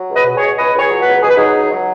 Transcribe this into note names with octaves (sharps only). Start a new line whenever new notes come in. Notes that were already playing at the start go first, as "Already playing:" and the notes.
Already playing: F#3
C#2
B4 D#5
B2
G#4 C#5
B2
C#2 B4 D#5
C#2
G#4 C#5
F#3
F#4 B4
C#2
B2 G#4
B4
F#3 D#4 G#4
C#2
F#3